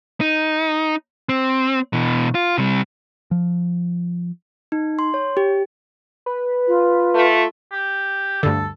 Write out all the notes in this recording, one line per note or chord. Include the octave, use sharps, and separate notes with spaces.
D#4
C4
B2 E3
F4
C3 G3
F3
D#4
C6
C#5
G4
B4
F4
A3
G4
D2 G2 D3 A4